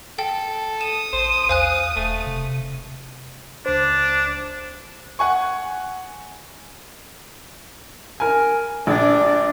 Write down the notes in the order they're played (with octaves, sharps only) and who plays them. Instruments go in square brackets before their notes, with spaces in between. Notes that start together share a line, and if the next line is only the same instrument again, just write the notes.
[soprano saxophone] A4 [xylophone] G5
[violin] D#6 [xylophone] E7
[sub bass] A#1 [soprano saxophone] C5
[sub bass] E2 [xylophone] C5 G#5 F#6 [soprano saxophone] F5
[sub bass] E1 [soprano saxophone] A3
[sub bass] C3
[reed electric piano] C#2 C5 [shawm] D4
[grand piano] F#5 G#5 C#6
[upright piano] A#4 G#5
[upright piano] A#1 [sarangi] D4